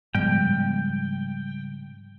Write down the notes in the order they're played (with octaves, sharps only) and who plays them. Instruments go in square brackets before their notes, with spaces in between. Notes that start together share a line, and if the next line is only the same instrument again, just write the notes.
[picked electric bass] G#2 G#3 [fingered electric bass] C#3 G3 [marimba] F3 B3 G6 [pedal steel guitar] G5